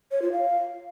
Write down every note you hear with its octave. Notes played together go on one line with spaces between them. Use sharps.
C#5
F4
F5